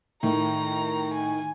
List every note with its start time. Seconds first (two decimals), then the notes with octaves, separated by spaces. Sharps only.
0.23 A2 D#3 A#5
1.15 G#5